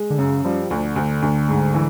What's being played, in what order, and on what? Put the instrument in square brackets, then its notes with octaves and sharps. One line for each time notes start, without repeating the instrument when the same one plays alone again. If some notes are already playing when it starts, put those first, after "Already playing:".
Already playing: [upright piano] G#3
[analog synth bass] D3
[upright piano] F#2 [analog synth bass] C#3
[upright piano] F3 [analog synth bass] G3
[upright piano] D2 [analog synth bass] D3
[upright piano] D2
D2
G#2
E3